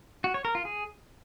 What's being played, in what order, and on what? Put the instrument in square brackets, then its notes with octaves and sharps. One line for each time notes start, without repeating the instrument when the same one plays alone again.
[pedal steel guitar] F#4
C#5
A#4
F4
G#4